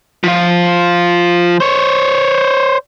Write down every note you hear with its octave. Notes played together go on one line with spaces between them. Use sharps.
F3 F4
C5 C#5